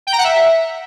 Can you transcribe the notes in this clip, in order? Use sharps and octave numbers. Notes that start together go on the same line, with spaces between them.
G5
A#5
F#5
E5